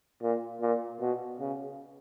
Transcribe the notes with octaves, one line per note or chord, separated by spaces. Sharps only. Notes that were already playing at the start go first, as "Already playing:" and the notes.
A#2
A#2
B2
C#3